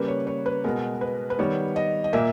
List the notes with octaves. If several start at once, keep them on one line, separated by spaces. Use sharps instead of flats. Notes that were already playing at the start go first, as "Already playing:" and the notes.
Already playing: C#3 G3 A#3 B4
C#5
C#5
B4
B2 G#3 B3 A#4
B4
B4
D#3 G3 B3 C#5
D#5
D#5
A#2 A#3 E5